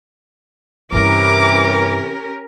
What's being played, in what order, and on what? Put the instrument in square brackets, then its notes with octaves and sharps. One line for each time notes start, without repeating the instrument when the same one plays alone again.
[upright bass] G2 G3 [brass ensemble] C3 E3 [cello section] C#4 G4 A#4 [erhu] D6